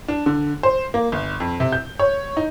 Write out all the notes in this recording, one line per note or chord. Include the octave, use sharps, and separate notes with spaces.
D4
D3
C5
A#3
G1
F2
C3
G6
C#5
D#4